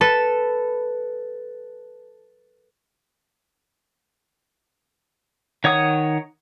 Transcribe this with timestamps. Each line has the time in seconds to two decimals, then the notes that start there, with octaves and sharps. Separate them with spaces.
0.01 A4 B4 E7
5.64 D#3 C#5 F#5 D#6